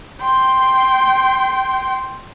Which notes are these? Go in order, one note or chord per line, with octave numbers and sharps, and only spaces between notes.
G5 C6